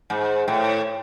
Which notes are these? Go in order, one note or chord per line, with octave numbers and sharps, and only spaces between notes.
G#2
A2